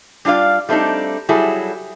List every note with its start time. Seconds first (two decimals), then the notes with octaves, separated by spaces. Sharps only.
0.25 G3 D4 F4 D5 F5
0.69 G3 A3 C4 D4 D#4
1.29 F#3 G3 E4 G#4 A4